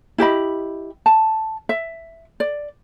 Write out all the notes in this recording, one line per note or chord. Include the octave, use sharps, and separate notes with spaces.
E4 G4 D#5 B5
A5
E5
D5